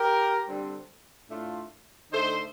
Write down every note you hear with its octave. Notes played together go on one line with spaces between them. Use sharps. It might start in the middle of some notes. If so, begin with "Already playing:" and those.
Already playing: G4 A#4
D3 G3 C4
A2 A3 D4 F4
D3 A3 D#4 A4 C5